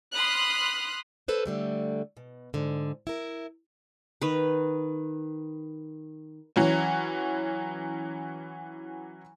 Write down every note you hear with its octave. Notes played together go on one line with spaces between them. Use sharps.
B5 C6 D#6 F6 F#6
A4 B4 C5
D3 G3 A3
B2
G#2 D3
E4 A#4
D#3 B4
E3 F#3 C#4